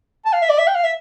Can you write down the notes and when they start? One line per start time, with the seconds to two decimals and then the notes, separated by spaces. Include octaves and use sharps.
0.25 A5
0.33 F5
0.42 E5
0.50 D5
0.58 E5
0.67 G5
0.75 F5
0.84 E5